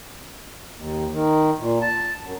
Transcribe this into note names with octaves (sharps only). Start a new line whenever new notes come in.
D#2
D#3
A#2
A5
F#2